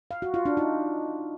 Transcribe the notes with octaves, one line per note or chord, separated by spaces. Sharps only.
F5
F#4
F4
D4
D#4